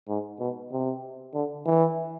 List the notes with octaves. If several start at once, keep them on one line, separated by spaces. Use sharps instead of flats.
G#2
B2
C3
D3
E3